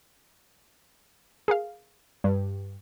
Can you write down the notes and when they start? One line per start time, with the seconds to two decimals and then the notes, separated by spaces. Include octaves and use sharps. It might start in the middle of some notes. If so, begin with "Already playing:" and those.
1.48 G#4 A#4 F5
2.24 G2